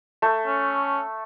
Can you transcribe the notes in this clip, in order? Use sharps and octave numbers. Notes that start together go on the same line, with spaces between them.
A3
C#4